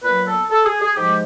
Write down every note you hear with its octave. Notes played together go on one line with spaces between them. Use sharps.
A#2 F#3 B3 B4
A4
A4
G#4
G#4
G#2 F3 G#3 G4